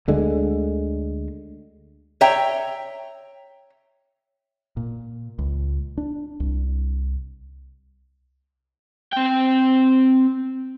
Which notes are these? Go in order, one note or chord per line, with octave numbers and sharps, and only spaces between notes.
D2 D3 G#3
C#5 E5 G5 A#5
A#2
C#2
D4
C2
C4 G5